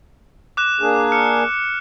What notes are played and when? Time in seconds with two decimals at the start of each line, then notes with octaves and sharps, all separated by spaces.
0.57 D6 F#6 E7
0.81 A#3 D4 G#4
1.12 F6 C#7